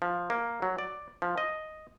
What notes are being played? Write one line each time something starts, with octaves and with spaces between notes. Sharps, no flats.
F3
A#3
F#3
D5
F3
D#5